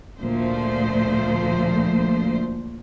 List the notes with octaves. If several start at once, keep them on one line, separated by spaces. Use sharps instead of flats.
D2 A#2 F3 A3 C5